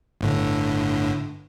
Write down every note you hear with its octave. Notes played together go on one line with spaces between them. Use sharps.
G1 A2 D3